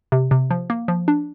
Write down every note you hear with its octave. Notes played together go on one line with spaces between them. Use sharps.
C3
C3
F3
A#3
F3
D4